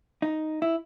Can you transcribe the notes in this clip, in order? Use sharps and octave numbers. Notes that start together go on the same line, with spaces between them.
D#4
E4